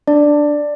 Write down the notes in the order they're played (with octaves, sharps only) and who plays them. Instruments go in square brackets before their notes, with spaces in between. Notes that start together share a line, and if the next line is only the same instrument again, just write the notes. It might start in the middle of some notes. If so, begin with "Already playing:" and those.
[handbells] D4 D5